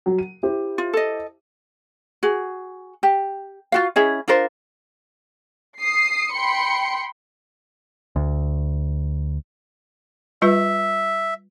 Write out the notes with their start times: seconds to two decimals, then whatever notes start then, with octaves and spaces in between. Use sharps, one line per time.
0.06 F#3
0.19 D#7
0.43 E4 G4 C5
0.78 F4
0.93 A4 D#5
2.23 F#4 G#4
3.03 G4
3.72 F4 F#4 F5
3.96 C#4 E4 G#4 D#5
4.28 D4 F4 A#4 C5
5.80 D#6 C7
6.32 G5 B5 C6 C#7
8.16 D2
10.42 G3 F4 B4 E5